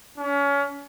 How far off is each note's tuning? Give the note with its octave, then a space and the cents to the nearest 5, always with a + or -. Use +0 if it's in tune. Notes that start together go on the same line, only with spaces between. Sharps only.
C#4 +30